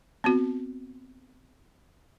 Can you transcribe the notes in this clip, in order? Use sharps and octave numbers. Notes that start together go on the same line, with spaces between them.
B3 C4 F#4